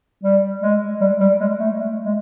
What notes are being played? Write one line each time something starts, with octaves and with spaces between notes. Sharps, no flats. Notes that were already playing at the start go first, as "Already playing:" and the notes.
G3
G#3
G3
G3
G#3
A3
A3
G#3